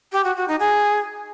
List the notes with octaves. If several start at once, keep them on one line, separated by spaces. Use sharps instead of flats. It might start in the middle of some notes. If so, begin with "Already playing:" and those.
G4
F#4
F#4
D#4
G#4